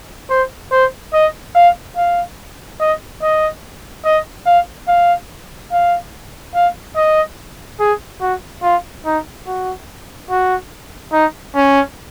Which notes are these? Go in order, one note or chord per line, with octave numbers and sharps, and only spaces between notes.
C5
C5
D#5
F5
F5
D#5
D#5
D#5
F5
F5
F5
F5
D#5
G#4
F#4
F4
D#4
F#4
F#4
D#4
C#4